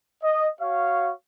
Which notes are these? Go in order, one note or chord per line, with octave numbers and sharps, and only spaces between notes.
D#5
F#4 C#5 F5